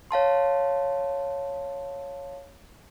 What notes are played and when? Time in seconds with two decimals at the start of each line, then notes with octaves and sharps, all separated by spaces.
0.11 C#5 F5 A5 C6